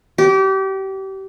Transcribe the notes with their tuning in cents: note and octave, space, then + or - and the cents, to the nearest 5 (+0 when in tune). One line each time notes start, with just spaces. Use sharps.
G4 -30